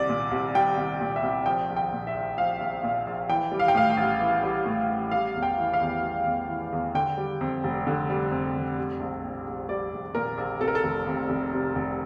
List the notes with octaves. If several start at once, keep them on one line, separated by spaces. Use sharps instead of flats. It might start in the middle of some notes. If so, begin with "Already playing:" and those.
Already playing: C2 G3 D5
A#2
C2
G3 G5
C2
A#2
E5
C2
F3 G5
A#1
G5
A#2
E5
A#1
F3 F5
A#1
A#2
A#1
E3 G5
G3
F5
G5
A2 F5
G5
A1
E3
G3
A2
A1
G3 F5
E2
G5
E3
F5
E2
G3
E2
E3
E2
D3 G5
G3
F2
F1
D3
G3
F2
F1
G3
A#1
A#2
A#1
G3 D5
A#1
A#2 A#4
A#1
C3 A4
A#4
A4
F1
F2
F1
C3
F1